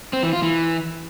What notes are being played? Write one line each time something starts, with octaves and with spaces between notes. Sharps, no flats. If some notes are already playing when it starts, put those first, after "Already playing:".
C4
E3
F4
E3